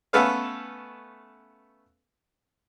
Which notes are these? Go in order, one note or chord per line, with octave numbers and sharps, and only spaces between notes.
A3 B3 C#4 A4 B4 F5